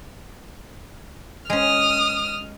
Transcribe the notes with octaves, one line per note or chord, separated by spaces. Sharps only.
G#3 C#4 D#6 F6